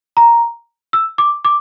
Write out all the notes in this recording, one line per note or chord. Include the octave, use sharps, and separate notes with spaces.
A#5
E6
D6
D6